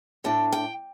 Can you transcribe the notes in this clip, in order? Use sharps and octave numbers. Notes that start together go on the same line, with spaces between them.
A2 A3 D4 G5
G5